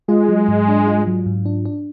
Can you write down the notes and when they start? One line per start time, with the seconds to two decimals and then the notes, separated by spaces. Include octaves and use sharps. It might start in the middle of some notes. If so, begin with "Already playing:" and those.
0.08 G#3 F4
0.29 F#3
0.48 G#2
0.68 D4
0.87 F4
1.07 F#3
1.26 G#2
1.46 D4
1.65 D4